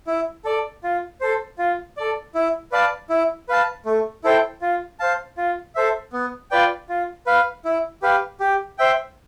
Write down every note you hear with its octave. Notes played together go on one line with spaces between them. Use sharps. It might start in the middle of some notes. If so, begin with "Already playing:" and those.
E4
A4 D5
F4
A4 C5
F4
A4 D5
E4
B4 D5 F5 A5
E4
B4 F5 A5
A3
E4 A4 C5 G5
F4
C5 F5 A5
F4
A4 C5 E5
B3
F4 B4 D5 G5
F4
B4 F5
E4
G4 B4 F5
G4
C5 E5 G5